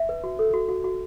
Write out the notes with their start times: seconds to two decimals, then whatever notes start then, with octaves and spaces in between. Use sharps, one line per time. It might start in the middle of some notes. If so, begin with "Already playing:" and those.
Already playing: E5
0.09 B4
0.24 F#4
0.39 A4
0.54 F#4
0.69 F#4
0.84 F#4